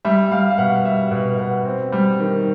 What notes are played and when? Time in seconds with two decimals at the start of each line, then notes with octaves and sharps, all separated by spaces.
0.05 G3 E5
0.31 G3 F5
0.50 F5
0.58 B2 F#5
0.85 G3 E5
1.11 B2 E5
1.39 B2 F#5
1.65 C4
1.92 G3
2.19 D#3